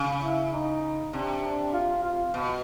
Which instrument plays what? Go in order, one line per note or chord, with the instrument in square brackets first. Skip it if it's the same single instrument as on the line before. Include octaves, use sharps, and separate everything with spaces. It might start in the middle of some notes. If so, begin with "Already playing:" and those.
Already playing: [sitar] C#3
[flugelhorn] E4
D#4
[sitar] C3 [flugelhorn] D4
[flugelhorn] D4
F4
F4
[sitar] B2